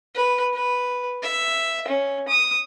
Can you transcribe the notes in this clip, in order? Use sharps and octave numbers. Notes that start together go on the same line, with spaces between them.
B4
B4
E5
C#4
D#6